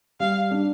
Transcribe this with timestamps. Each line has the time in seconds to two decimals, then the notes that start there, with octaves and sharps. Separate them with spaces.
0.20 G3 F5
0.51 D4